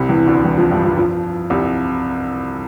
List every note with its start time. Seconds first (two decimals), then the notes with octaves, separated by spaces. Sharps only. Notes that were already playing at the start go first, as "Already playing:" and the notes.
Already playing: C2 C3
0.09 E2 E3
0.26 D2 D3
0.44 E2 E3
0.57 F2 F3
0.71 G2 G3
0.84 F2 F3
0.97 F2 F3
1.50 C2 C3